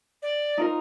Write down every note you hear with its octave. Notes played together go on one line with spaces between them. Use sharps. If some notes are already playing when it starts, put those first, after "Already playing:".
D5
D#4 F4 A#4